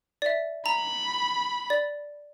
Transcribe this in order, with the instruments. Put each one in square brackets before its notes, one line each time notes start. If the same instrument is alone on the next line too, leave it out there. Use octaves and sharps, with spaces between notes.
[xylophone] D5 E5
[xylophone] A#5 [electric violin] B5
[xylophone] D5